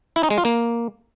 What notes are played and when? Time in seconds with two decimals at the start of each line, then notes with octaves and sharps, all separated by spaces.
0.16 E4
0.23 D#4
0.30 G#3
0.38 F4
0.45 A#3